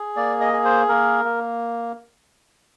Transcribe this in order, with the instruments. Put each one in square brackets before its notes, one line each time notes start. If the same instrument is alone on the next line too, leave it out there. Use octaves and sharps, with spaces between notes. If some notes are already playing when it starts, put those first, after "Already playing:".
Already playing: [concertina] G#4
A#3 D5
D#5
G#4
C5
A#3 A#4
A#3